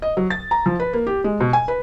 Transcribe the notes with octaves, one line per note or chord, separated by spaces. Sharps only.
D#5
F#3
A6
A#5
F3
B4
A#3
G4
G#3
B2
G#5
B4